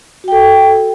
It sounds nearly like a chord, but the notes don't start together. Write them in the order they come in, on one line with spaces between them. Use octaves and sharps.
F#4 G5 A4